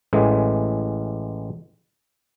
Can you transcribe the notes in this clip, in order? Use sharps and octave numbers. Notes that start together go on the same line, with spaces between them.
A1 A2 E3 G#3